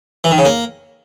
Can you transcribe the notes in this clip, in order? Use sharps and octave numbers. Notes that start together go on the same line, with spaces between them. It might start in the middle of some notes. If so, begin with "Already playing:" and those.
E3
D#3
C#3
A#3